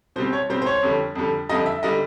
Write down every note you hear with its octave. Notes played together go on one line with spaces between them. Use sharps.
B2 G3 C4 C5
C#5
B2 G3 C4 C5
C5
C#5
F2 D3 G3
F2 D3 G3
F2 D3 G3 D#5
E5
D3 G3 D#5